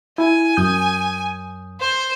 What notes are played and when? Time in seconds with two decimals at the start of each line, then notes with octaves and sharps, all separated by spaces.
0.18 E4 G#5
0.57 F#2 D#6 G6
1.80 C5